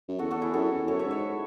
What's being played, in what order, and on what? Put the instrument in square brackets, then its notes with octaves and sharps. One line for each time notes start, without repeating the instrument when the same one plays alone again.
[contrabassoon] F#2
[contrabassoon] E2 [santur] F#4 A4
[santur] F#4 A4
E4 G#4
[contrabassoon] F#2 [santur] F#4 A4
[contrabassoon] E2
[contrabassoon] F#2 [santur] A4 C#5
[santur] C#5 E5
[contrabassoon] G#2
[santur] C#5 E5